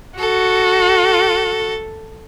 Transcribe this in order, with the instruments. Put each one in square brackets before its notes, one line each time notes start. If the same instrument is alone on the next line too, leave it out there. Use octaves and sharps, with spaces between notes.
[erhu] F#4 [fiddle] A4